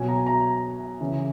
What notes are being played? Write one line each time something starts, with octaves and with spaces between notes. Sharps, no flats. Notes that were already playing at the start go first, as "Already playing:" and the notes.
Already playing: B2 F#3 G#5
A#5
A#5
C#3 E3